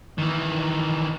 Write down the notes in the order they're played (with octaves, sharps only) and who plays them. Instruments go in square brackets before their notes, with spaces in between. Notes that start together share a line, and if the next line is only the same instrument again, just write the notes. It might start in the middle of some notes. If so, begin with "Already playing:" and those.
[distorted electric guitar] D#3 E3